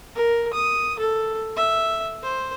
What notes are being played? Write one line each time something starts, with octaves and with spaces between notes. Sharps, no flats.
A#4
D#6
A4
E5
C5